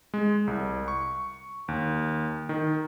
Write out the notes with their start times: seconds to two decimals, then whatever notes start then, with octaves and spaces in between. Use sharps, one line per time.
0.14 G#3
0.47 C2
0.88 C#6
1.68 D#2
2.49 D#3